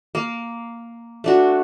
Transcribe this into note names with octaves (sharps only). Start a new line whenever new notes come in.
A#3
A3 D4 F#4